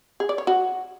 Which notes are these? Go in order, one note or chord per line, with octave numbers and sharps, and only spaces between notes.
G#4
D5
C#5
F#4